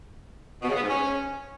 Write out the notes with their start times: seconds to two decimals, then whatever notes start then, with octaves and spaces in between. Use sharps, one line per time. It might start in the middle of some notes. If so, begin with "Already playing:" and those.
0.62 B2
0.68 C#3
0.75 B3
0.82 G#2
0.89 C#4